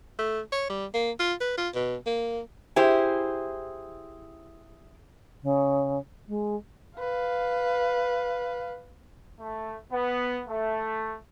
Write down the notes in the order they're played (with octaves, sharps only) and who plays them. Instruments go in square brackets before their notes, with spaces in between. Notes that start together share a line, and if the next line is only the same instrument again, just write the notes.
[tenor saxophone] A3
C#5
G3
A#3
F4
B4
F4
B2
A#3
[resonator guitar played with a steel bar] E4 G4 G#4 C5
[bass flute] C#3
G#3
[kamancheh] B4 F5
[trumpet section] A3
B3
A3